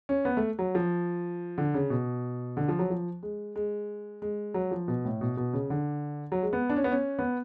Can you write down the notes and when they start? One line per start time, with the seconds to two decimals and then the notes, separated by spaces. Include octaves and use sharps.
0.09 C#4
0.25 B3
0.37 A3
0.59 F#3
0.75 F3
1.58 D3
1.74 C#3
1.90 B2
2.57 D3
2.68 F3
2.79 F#3
2.90 F3
3.23 G#3
3.56 G#3
4.22 G#3
4.54 F#3
4.71 F3
4.88 B2
5.05 A2
5.21 B2
5.37 B2
5.53 C#3
5.70 D3
6.32 F#3
6.42 G#3
6.53 B3
6.70 D4
6.76 C#4
6.84 B3
6.92 C#4
7.19 B3